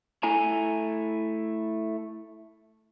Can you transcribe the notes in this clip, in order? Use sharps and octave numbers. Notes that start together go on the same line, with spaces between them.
A3 E4 G#5 A#5